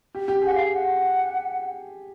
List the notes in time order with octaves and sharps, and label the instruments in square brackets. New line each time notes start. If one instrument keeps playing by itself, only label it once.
[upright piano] G4
G4
[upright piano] G#4 [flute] F#5
[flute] F5
F#5